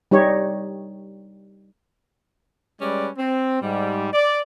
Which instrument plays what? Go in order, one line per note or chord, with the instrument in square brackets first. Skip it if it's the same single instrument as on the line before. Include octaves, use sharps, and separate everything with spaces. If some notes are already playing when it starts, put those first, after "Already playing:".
[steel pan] G3 D#4 G4 C#5
[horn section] G3 G#3 C#4 B4 D5
C4
G#2 G3
D5